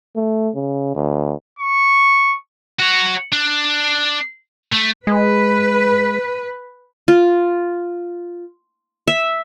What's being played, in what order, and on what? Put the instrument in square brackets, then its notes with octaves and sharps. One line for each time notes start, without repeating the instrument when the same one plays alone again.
[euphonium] A3
C#3
D2
[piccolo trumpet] C#6
[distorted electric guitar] F#4 C#5
D4
A3
[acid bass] G#3 [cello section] B4
[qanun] F4
E5